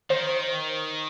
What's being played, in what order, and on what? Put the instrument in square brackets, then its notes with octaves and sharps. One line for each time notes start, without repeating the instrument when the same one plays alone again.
[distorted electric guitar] D#3 [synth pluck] C5